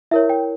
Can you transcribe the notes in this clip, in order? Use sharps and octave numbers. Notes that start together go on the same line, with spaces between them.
E4 A#4 C#5 E5
G5